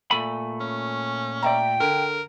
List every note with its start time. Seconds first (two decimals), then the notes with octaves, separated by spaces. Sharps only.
0.11 A#2 A3 B5 D#7
0.60 C#4
1.43 D5 E5 G5 A#5
1.80 D3 A#4